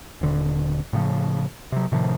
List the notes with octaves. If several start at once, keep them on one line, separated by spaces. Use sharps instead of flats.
D#1 D3
A2 C#3 F3
C3 F#3
A2 C3 D#3 F3